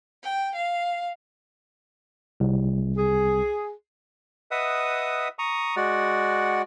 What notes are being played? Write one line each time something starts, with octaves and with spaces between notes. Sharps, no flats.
G5
F5
C2
G#4
B4 D#5 E5 F#5 D#6
A#5 C#6 D#6
G#3 F#4 D5 F#5